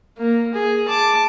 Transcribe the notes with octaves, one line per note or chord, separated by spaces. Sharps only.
A#3
G#4
A5 D6